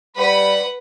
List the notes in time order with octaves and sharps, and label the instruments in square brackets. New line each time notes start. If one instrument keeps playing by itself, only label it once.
[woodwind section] G3 B5 [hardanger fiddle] B4 F#5